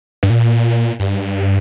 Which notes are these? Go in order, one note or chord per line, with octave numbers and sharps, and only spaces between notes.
G2
A#2
G2